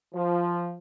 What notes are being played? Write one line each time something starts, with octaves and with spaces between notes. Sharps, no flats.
F3